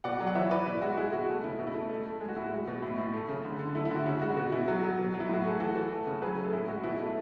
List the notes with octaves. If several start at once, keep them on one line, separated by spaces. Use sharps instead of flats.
B2 D5 F#5
F#3
F#5
E3 C#5 E5
E3 B4 D5
B2 E4
G#3 F#4
G#3 E4 G#4
B2 F#4
A3
C#3 E4
B2
E4
A3
A3
A3
G#3 G#4
F#4
A2 E4
F#4
G#3
B2
A2 E4
A2
A3
C#3
D3
D3
A3 E4
E4
D3 F#4
C#3 E4
G#3 F#4
B2 F#4
B2 E4
F#3 F#4
F#3
B2
F#3
E4
A2 F#4
A3 G#4
E3 F#4 A4
E3
A3
C#3
F#3 G#4 B4
A3
A4
A2 E4 G#4
G#3 F#4
B2 E4
A3 E4